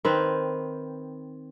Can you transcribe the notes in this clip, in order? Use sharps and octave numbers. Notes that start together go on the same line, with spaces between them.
D#3 C4 B4